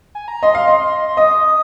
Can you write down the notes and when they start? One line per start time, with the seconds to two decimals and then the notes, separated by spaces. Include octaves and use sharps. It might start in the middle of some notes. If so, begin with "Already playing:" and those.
0.15 G#5
0.28 A#5
0.43 D#5 C6
0.55 F5
0.67 D#5
1.17 D#5 D#6